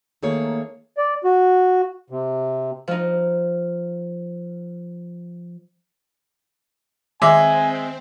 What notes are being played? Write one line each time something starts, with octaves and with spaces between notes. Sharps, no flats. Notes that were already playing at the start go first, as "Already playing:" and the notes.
D#3 A3 A#3 G#4 A4 C#5
D5
F#4
C3
F3 D#4
D#3 G#3 C4 E5 G#5 C6 D6